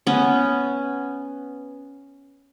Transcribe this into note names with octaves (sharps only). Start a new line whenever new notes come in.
B3 C#4